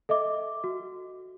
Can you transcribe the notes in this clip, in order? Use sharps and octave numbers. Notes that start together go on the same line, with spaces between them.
A4 D#5 E5 D6
F#4